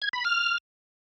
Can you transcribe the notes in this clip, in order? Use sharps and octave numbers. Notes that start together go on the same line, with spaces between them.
G#6
B5
F6